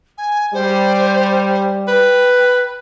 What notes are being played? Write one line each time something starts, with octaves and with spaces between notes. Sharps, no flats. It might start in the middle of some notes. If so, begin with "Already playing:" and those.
G#5
G3 C5
B4 G5